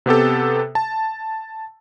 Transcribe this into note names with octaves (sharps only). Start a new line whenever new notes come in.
C3 B3 G4 A4
A5